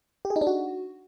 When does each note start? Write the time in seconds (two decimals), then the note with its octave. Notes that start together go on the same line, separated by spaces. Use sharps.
0.25 G4
0.30 G#4
0.36 D#4
0.41 D4
0.47 F#4